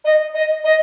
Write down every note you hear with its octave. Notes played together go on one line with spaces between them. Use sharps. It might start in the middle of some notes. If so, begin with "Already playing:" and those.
D#5
D#5
D#5